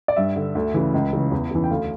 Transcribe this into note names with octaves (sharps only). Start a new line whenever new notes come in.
D5
G2 E5
D3
D2
C#3 E3
C#2
C#3 E3
E2
C#3 E3
G5
D2 F5